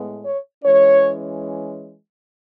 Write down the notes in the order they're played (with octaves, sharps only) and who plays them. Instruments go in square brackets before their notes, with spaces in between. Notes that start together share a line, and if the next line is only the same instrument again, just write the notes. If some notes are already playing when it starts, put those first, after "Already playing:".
Already playing: [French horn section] A2 G#3 B3
C#5
E3 G#3 C#4 C#5